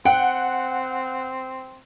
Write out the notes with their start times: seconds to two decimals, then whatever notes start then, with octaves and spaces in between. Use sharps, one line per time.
0.05 C4 F#5 G5